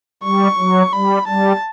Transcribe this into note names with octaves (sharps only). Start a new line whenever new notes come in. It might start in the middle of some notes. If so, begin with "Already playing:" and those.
G3 C#6
F#3
G3 B5
G3 A5